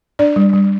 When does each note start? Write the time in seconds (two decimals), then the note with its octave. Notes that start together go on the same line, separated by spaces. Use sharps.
0.19 D4 D5
0.36 G3
0.53 G3